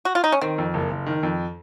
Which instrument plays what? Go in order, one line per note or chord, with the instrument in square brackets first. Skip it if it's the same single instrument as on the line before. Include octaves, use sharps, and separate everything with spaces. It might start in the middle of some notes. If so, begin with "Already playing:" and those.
[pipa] F#4
F4
D#4
C#4
[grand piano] D#3 [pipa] C4
[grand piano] F2
F#1
F#1
D#3
F2